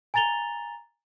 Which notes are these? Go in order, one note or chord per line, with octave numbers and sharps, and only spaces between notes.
G#5 A#5 A6 F7 G7